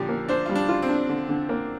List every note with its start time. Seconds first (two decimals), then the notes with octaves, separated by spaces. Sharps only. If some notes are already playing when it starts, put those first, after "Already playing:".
Already playing: A#2 D3 F3 G4
0.09 A#3
0.28 D4 C5
0.46 G3 F4
0.55 D4
0.69 F4
0.82 C4
0.89 D4
1.09 D3
1.29 D3
1.49 A#3